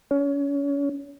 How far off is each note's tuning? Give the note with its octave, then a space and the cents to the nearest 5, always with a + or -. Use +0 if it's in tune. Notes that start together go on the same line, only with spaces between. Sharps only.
C#4 +30